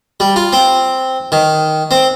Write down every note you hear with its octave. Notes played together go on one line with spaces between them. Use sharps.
G3
F4
C4
D#3
C4